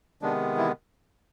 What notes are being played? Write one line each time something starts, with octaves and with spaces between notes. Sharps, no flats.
C3 D#3 G#3 B3 D4
E3 E4